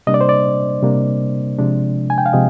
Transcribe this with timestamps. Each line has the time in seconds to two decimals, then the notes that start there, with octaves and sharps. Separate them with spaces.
0.07 C3 G3 A#3 D4 D#5
0.14 D5
0.21 C5
0.29 D5
0.82 C3 G3 A#3 D4
1.58 C3 F3 G#3 D4
2.10 G#5
2.18 G5
2.26 F5
2.33 C3 F3 G#3 D#5